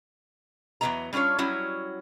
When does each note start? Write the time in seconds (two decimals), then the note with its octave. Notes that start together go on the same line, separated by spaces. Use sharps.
0.81 E2 F#3 B3 C#4 D#5 A#5
1.13 G3 C#4 D4 F4 C#5
1.38 F#3 G3 C#4 E4 F#4